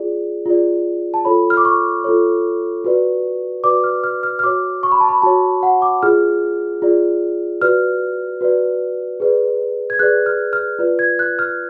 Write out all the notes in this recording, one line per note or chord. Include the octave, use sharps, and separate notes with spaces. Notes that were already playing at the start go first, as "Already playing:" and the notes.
Already playing: F4 G#4 D5
F4 G#4 D5
A5
F4 A4 C#5 B5
F6
D6
C#6
F4 A4 C#5
F#4 B4 D5
F#4 B4 D5 D6
F6
F6
F6
F6
F#4 C#5 D6
C#6
B5
A5
B5
F#4 C#5 A5
F#5
D6
F4 G#4 D5 F6
F4 G#4 D5
F#4 B4 D5 F6
F#4 B4 D5
G#4 B4 D5
G#6
G#4 B4 D5 F#6
F6
F6
F4 B4 D5
G#6
F#6
F6